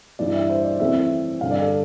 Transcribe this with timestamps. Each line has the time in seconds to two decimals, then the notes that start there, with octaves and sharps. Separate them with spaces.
0.19 G2 E3 G3 D5
0.34 E5
0.50 C5
0.64 D5
0.80 F2 E3 A3 C4 E5
0.96 E5
1.41 G2 D3 G3 D4 F5
1.51 D5
1.62 A4